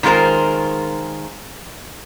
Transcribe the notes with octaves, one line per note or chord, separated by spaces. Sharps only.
D#3 G#3 F4 A#4 C5